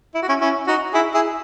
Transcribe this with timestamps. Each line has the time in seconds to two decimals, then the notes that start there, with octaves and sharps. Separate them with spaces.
0.14 E4
0.22 F#4
0.28 C#4 E4
0.41 C#4 E4
0.67 D#4 F#4
0.93 E4 G#4
1.14 E4 G#4